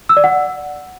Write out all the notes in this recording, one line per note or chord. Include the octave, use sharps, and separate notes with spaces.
E6
D5
F#5